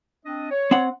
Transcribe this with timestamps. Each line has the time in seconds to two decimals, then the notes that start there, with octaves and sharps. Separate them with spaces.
0.25 C4 D4 D#5
0.51 C#5
0.71 C4 F#5